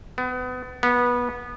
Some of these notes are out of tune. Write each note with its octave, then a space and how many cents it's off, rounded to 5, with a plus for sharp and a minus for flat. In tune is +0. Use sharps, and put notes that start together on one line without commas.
B3 +30
B3 -20